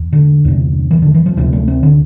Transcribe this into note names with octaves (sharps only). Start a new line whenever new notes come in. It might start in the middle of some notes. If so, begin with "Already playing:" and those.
Already playing: E2
D3
E2 C3
E3
D3
E3
F3
D2 C3 F3
A3
C4
D3